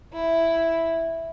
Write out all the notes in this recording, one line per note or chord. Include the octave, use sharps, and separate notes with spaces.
E4